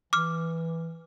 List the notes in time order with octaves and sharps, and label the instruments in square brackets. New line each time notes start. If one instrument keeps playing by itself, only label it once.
[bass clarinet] E3 [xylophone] D6 F6